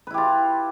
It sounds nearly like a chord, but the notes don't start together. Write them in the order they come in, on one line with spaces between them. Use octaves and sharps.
B4 E4 G4 F4